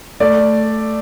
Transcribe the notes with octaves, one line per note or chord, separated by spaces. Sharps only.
A3 D5